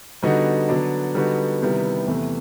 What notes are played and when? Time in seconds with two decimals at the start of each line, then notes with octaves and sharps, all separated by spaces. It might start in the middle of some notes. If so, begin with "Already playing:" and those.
0.23 D3 G3 B3 D#4 F#4
0.69 D3 F#3 B3 D4
1.15 D3 G3 B3 D#4 F#4
1.62 C3 D#3 G3 B3 E4
2.07 E2 C3 E3 A3